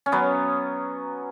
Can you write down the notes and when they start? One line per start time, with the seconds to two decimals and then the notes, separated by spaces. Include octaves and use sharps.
0.06 C#4
0.12 F#3 B3